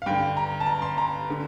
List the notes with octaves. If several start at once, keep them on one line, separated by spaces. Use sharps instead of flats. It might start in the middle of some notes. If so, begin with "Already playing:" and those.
F5
G2 D3 G5
A#5
A5
A#5
C6
A#5
D3